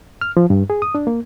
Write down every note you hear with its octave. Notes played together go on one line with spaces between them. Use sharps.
F6
F3
G2
G#4
D#6
D4
A#3